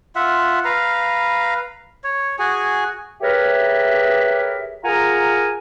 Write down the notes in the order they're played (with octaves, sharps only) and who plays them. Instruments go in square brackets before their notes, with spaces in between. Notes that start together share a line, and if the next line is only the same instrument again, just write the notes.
[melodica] F4 E5 F#5
B4 F5 A#5
C#5
F#4 G#4 G#5
[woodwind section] G4 G#4 A#4 B4 C#5 E5
F4 G#4 A#4 F#5 G#5 A#5